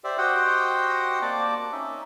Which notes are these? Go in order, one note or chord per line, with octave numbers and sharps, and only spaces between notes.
G4 C5 D5 E5
F#4 G4 C5 D#5 F#5 G5
A#3 C4 D5 A5 D6
C#4 D#4 E5